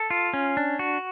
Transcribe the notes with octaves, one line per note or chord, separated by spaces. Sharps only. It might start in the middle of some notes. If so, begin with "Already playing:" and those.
Already playing: A4
F4
C#4
D4
F#4